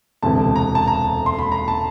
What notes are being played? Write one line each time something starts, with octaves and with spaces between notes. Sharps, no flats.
E1 D2 C3 E3 A5
A#5
A5
A#5
C6
B5
A#5
A5